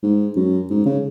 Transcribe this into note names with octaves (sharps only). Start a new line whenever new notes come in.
G#2
F#2
G#2
C#3